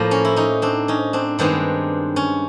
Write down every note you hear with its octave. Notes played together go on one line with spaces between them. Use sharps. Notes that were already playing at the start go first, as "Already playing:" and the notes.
Already playing: A2 F3 A#3
C#4
E4
C#4 D#4
C4 D4
C#4 D#4
C4 D4
G2 D#3 G#3 B3 C4 D4
C#4